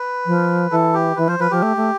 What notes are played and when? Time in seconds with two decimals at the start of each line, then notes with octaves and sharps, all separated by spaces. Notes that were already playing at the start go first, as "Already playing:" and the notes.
Already playing: B4
0.26 F3
0.71 E3 A4
0.94 G4
1.16 E3 B4
1.28 F3 C5
1.39 F3 B4
1.51 F3 G4
1.62 A3
1.77 A3